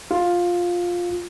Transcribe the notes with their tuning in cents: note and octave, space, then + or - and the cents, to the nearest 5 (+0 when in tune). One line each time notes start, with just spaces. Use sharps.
F4 +10